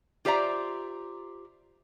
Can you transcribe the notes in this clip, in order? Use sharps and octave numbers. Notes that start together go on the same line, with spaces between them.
F4 G4 C5 D5 E5 A#5